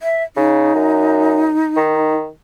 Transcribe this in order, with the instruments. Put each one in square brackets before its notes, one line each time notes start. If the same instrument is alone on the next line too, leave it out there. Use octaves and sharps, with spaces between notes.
[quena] E5
[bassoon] C#3 [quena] D#4
[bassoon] F#2
D#3